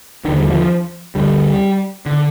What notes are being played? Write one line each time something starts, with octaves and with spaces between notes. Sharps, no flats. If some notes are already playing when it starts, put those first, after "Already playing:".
D#2 D3 D#3
G3
F3
D2 D3 G3
D3